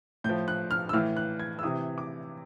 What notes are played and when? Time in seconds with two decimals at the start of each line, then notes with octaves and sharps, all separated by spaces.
0.24 A2 F3 G6
0.48 F#6
0.71 F6
0.89 E6
0.93 A2 E3 F6
1.17 F#6
1.39 G#6
1.59 E6
1.63 C3 E3 D#6
1.98 D6